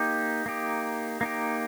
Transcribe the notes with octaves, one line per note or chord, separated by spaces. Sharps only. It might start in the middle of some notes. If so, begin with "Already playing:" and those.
Already playing: A#3 D#4 G4
A#3 D#4 G4
A#3 D#4 G4